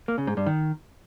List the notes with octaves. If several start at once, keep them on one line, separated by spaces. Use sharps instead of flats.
A#3
C#3
G#2
G2
D#3